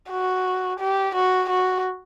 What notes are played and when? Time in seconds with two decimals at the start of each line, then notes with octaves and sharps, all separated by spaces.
0.11 F#4
0.80 G4
1.15 F#4
1.50 F#4